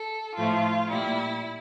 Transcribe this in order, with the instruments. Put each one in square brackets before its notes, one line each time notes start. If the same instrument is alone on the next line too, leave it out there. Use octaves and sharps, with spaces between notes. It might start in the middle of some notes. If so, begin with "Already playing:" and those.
Already playing: [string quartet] A4
A2 F3 A3 F4
A#2 G3 E4